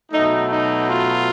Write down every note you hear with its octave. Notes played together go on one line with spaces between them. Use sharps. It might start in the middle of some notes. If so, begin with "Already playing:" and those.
B2 F#3 A3 D#4
D#4
F4